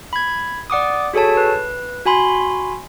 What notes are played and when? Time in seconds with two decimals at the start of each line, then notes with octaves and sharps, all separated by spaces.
0.13 B5 G#6
0.70 D5 F#5 D6 D#6
1.14 F#4 G#4 A4 C#5 A5
1.37 B4
2.06 F#4 G#5 B5 C6